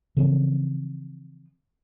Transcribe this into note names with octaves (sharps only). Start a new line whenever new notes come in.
C#3 E3 F3 C4